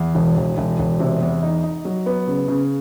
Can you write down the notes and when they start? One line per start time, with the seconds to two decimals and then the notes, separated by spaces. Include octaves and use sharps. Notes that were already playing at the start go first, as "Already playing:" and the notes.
Already playing: E2
0.15 E1
0.37 E1
0.58 E1
0.79 E1
1.00 C3
1.22 E2
1.43 D#4
1.63 D#4
1.85 F#3
2.06 B3
2.27 C#3
2.48 C#3